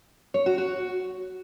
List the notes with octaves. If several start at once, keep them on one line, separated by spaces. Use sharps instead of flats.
C#5
F#4
F#4